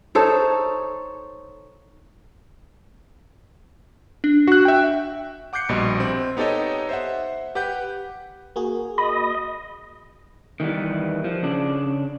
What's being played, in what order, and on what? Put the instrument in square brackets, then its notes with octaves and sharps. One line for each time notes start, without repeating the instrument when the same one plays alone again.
[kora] D#4 A4 C5 C#5
[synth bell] D4
[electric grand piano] F#4 F#6
E5 G5
F#5 D6 F#6 G6 C7 C#7
A#1 B2 G3 D#5
C4
B3 D#4 G4 A4 C#5 D#5
C5 E5 F#5
G4 B4 F#5 G6
[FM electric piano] A#3 F#4 G#4
[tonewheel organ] D#5 [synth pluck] B5
[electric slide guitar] D#3 E3 G3 B3
F3
C#3 D4